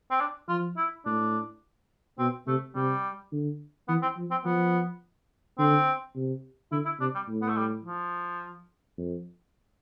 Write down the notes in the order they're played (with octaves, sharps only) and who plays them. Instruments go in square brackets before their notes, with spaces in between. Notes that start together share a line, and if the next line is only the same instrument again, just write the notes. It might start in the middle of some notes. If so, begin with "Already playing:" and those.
[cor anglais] C4
D4
[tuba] F3 [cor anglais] F4
[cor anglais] E4
[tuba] A2 [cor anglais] D4
[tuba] B2 [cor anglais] C4
[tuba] C3 [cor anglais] A3
[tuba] C3 [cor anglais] G3
[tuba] D3
[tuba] E3 [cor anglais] B3
[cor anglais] C4
[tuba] F3
[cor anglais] C4
[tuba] F3 [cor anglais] B3
[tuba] D3 [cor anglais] C4
[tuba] C3
[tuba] D3 [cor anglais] E4
[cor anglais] E4
[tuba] C3 [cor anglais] D4
[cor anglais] G3
[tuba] A2
[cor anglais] B3
A3
G3
F3
[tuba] F2